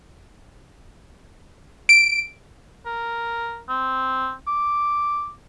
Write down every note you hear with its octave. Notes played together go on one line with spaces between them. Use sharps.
D7
A#4
C4
D6